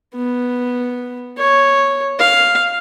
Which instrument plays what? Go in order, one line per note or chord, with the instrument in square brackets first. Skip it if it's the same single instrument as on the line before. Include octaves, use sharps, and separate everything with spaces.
[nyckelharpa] B3
C#5
F5